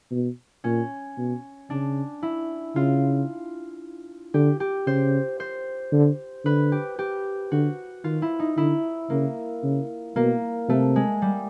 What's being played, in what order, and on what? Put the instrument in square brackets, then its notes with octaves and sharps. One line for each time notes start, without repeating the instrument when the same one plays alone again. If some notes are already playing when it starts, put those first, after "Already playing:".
[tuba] B2
[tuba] A#2 [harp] C#4
[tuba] B2
[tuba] C#3 [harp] D4
[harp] E4
[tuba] C#3 [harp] F4
[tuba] D3 [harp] G4
[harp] G4
[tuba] C#3 [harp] C5
[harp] C5
[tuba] D3
[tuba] D3 [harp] B4
[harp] G4
G4
[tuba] D3 [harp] F#4
[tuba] D#3 [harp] F4
[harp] E4
D#4
[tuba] D3 [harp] E4
[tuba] C#3 [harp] A#3
[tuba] C#3
[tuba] B2 [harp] A#3
[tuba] C3 [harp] A3
[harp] G#3
G3